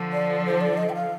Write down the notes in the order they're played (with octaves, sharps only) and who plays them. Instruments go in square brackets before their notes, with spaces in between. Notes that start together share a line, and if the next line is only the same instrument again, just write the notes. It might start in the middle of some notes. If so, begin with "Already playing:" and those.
Already playing: [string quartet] D3 F3
[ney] D5
C5
D5
D#5
G5
F5